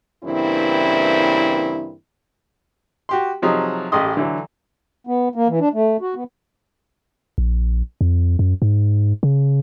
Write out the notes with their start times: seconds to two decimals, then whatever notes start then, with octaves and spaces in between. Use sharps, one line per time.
0.24 G2 C#3 E3 A#3 C4 E4
3.09 F#4 G4 C6
3.42 C3 F3 F#3 D#4 G#4
3.92 A1 G4 G#4 D#5 C6 D#6
4.17 D3 E3 F#3
5.07 B3
5.35 A#3
5.48 E3
5.60 D4
5.73 A3
6.01 F#4
6.15 B3
7.38 A#1
8.01 F2
8.39 F#2
8.62 G#2
9.23 C#3